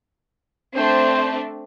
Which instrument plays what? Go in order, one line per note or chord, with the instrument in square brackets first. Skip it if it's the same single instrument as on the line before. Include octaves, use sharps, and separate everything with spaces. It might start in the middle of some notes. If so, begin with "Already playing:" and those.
[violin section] A3 C4 D4 [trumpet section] C5